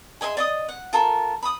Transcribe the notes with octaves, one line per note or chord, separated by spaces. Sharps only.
G#4 D#5 E5 C6
D5 D#5 D#6
F#5
F4 A4 A#4
B5 D#6